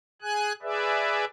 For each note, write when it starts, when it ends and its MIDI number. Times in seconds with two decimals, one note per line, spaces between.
0.22 0.53 68
0.22 0.53 80
0.22 0.53 90
0.62 1.25 68
0.62 1.25 71
0.62 1.25 74
0.62 1.25 76